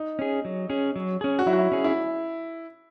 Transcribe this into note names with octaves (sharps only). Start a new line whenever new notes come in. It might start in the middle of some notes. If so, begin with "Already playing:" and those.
Already playing: D#4
C#4 G#4
F#3
C#4 G#4
F#3
C#4 G#4
F#4
F#3 E4
F#4
E4
C#4 G#4
E4